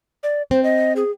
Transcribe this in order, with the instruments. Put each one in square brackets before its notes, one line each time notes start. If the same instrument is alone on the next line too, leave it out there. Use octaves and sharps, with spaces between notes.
[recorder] D5
[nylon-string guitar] C4 [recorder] C5
[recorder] D#5
G#4